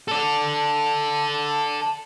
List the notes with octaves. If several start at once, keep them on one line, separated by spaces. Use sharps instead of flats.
A4 D5